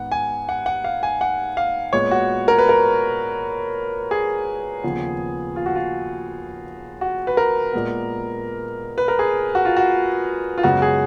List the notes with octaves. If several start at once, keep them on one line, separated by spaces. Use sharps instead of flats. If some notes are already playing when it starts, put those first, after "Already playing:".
Already playing: G#2 D#3 B3 F#5
G#5
F#5
F#5
F5
G#5
F#5
F5
A#2 G#3 B3 C#5
F#4
A#4
B4
A#4
G#4
D#2 C#3 F3 B3
F4
F#4
F4
F#4
B4
A#4
A#2 G#3 B3
B4
A#4
G#4
F#4
F4
F#4
F4
F#2 C#3 G#3 B3 F#4
G#4